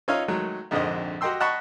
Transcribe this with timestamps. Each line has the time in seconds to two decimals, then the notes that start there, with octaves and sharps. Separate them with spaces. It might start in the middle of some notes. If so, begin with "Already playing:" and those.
0.08 C#4 D#4 F4 C#5 E5 F5
0.28 D#3 F#3 G#3 A3
0.71 A#1 F2 G#2 D3 C4 D#5
1.21 F#4 G4 D#5 G5 C6 E6
1.40 D#5 F#5 A5 B5 C#6